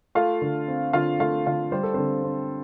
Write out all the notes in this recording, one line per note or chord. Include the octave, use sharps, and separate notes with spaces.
A3 F4 F5
D3
C4
D3 F4 F5
A3 F4 F5
D3 F4 F5
G3 C5
A4
D3 C4 C5
C4